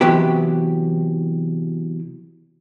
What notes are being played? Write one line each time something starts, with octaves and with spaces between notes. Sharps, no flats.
C3 E3 F#3 B3 G4